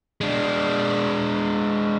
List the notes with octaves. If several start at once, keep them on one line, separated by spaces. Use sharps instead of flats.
G#3 D4